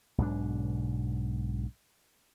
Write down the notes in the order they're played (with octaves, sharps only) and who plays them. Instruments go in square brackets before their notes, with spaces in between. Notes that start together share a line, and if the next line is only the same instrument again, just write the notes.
[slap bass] B1 G#2 B2 D4